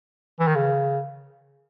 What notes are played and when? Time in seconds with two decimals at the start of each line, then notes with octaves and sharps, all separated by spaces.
0.39 E3
0.47 D#3
0.55 C#3